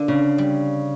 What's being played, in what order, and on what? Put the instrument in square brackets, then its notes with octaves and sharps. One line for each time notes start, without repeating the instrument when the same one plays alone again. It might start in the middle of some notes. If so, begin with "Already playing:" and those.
Already playing: [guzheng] D3 A#3
[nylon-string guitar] C#3
[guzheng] G3